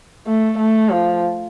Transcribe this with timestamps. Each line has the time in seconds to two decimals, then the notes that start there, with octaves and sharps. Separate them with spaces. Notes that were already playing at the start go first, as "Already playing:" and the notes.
0.27 A3
0.59 A3
0.90 F3